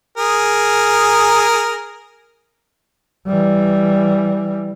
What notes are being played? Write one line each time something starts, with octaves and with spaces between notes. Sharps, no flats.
G#4 A#4
E3 G3